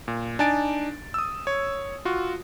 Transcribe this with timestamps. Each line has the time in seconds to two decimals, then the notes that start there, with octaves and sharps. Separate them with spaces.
0.08 A#2
0.39 D4 D#4 G#5 A6 D7
1.14 D#6 E6
1.47 C#5
2.05 F4 F#4